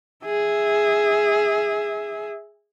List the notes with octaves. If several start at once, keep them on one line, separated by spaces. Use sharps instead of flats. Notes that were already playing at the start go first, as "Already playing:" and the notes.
G#4 E5